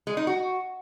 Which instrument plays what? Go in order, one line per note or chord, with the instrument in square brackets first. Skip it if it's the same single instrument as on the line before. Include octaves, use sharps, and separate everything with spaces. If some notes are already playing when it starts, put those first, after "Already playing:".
[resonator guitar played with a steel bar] G#3
D#4
F#4